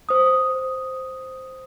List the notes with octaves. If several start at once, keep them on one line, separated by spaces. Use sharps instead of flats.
C5 D#6